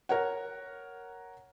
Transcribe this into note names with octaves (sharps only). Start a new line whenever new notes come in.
A#4 C#5 F#5